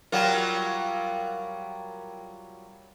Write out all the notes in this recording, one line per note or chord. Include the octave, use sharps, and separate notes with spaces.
F#3 G3 F4 A#4 F#5 G5